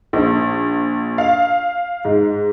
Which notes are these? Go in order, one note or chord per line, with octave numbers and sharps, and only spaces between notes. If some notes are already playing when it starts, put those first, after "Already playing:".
A#1
F5
G#2